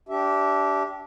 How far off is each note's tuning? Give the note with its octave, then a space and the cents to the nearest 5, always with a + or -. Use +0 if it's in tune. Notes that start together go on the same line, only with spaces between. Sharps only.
D4 -20 G4 -15 E5 +0